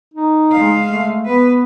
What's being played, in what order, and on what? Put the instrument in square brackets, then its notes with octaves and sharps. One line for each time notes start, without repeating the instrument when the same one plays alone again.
[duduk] D#4
[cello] G#3 F5
[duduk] A3
[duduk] B3 [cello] B4